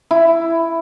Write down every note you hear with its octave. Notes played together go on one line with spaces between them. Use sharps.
E4